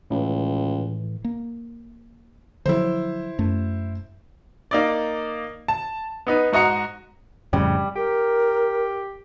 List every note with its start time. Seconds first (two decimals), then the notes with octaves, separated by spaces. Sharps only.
0.10 C#2 A2 E3
1.25 A#3
2.66 D3 F3 F#3 E4 C5
3.39 F#2 A3
4.71 A#3 D#4 D5
5.68 A5
6.27 B3 D#4 B4
6.52 G#2 F#4 D#5 A#5 C#7
7.53 F2 A2 C#3 G3
7.96 G4 A#4